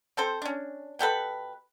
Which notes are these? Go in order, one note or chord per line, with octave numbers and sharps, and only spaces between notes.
C4 A4 C5
C#4 D4
B2 G4 A4 B4